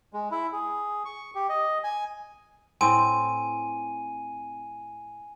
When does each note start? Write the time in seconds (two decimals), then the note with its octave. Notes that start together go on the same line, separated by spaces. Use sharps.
0.13 G#3
0.31 E4
0.53 G#4
1.05 C#6
1.35 G4
1.49 D#5
1.84 G#5
2.81 A2 C4 G#5 D#7